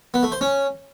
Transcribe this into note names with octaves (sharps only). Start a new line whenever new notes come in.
B3
A3
C5
C#4